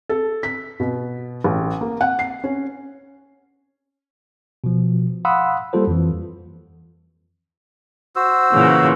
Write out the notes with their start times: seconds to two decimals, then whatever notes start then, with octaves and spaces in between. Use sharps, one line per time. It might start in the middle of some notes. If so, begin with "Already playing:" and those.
0.09 A4
0.43 B6
0.80 B2
1.44 A1
1.81 A#3
2.01 F#5
2.19 C7
2.44 C#4
4.64 B2 F3
5.25 F5 F#5 B5 C6 D#6 E6
5.73 G3 A#3 F4 A4 C5
5.87 F2 E3
8.16 F#4 C5 E6
8.52 A#2 C#3 E3